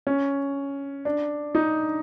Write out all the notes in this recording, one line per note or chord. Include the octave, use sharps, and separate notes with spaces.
C#4
D4
D#4